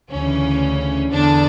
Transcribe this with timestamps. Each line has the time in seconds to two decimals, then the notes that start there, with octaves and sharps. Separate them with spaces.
0.10 D2 C#3 E3 C#4
1.10 E2 D3 D4